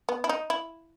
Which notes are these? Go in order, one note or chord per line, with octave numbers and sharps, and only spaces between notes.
B3
E4
D#4
E4